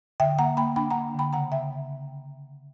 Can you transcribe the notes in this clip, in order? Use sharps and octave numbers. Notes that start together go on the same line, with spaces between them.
D3 E5 G5
A#3 F#5 A#5
A#3 G5 B5
D4 G5 B5
A#3 F#5 A#5
D3 G5 B5
C#3 F#5 A#5
C#3 E5 G5